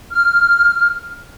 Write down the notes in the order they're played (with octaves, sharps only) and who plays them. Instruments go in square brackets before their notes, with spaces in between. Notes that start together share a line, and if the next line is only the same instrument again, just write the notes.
[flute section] F6